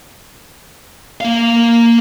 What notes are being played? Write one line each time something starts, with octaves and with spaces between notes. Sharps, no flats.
A#3 F5